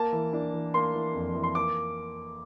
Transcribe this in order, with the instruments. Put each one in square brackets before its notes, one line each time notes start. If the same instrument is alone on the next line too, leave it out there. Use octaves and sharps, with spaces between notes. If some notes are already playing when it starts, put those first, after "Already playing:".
Already playing: [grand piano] A#3 A5
E3
D4
E3
A#3 C6
E3
F2
E3
C6
A#3 D6